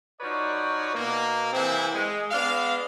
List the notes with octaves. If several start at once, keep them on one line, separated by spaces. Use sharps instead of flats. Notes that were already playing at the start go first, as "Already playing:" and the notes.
F3 D#4 F#4 B4 C#5 D5
B2 A#3
C3 E3 A#3 C4 E4 G#4
G#3
G#3 B3 D4 F5